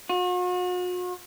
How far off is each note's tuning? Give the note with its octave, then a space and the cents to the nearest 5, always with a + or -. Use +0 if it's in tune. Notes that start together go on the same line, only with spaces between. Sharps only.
F#4 -45